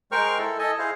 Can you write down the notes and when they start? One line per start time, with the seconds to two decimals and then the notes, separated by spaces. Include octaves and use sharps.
0.12 G#3 A#4 C5 G5 C#6 F6
0.38 E4 A4
0.59 A4 D#5 G#5
0.79 E4 G#4 C5 F5